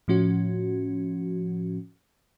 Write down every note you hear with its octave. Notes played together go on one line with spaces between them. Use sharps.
A2 F3 C#4 F#4